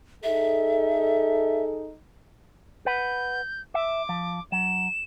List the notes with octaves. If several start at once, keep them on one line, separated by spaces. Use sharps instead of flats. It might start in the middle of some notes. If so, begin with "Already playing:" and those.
D#4 G#4 A4 E5
B4 F#5 G6
E5 D6
F3
F#3 E7